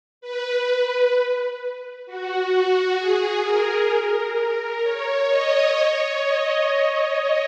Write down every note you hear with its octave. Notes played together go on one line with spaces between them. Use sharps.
B4
F#4
G#4
A#4
C#5
D#5
C#5
D#5